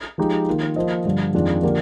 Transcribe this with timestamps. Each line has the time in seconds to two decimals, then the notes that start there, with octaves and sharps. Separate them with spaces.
0.18 F3 G#3 D#4 G4
0.47 D#3 A#3 F4
0.76 F3 A#3 F4 C5 D#5
1.05 G2 D3 F3
1.34 F2 D#3 G#3 D4 F4
1.63 D3 F3 A#3 D4 G4